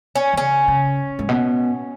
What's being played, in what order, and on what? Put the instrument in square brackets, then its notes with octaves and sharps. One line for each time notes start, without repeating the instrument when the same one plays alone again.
[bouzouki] C#4
[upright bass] E3
[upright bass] C#3 [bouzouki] C#4
[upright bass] C#3
G#2
B2